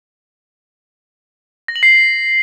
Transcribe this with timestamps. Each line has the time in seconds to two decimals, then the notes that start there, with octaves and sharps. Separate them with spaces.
1.68 A#6
1.76 F#7
1.83 C7